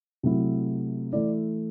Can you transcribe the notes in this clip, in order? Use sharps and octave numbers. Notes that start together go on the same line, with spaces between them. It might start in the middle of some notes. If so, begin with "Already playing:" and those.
C3 F#3 A3 E4
E3 A3 E4 D5